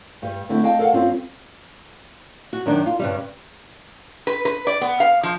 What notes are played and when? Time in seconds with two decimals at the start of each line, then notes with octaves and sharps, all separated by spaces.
0.22 G2 G3
0.49 D3 A3 C4 E4
0.64 D#5 F5 G5 A5
0.79 A4 A#4 C#5 F5 F#5
0.93 G2 C4 C#4 F4
2.53 F#4
2.66 F#2 D#3 D4
2.86 F4
2.99 G2 C#3 G3
4.27 B4
4.45 B4
4.67 D5
4.81 B3
5.00 F5
5.23 F3